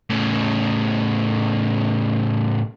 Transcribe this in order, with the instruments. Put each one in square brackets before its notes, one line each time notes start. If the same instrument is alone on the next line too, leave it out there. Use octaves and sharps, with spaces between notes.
[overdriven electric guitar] A2 C#3